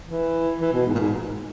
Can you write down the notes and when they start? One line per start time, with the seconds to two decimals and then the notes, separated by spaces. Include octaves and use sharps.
0.08 E3
0.60 E3
0.73 B2
0.86 G#2
0.95 A#2
0.99 G#2